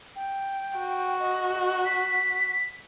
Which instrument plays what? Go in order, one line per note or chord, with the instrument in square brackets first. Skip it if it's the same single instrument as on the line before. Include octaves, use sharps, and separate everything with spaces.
[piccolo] G5
[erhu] F#4
[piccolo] D#5
B6